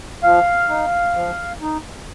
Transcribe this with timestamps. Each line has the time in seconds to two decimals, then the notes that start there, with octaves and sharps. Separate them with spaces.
0.23 F3 F5
0.69 D#4
1.15 F3
1.61 D#4